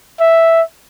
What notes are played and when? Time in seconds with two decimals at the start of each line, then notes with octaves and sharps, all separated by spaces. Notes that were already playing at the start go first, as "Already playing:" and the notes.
0.20 E5